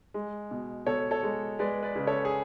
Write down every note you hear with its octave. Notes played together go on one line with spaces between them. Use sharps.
G#3
B2
B2 A4 C#5
A4 C#5
G#3
G#3 B4 D5
B4 D5
C#3
A4 C#5
G#4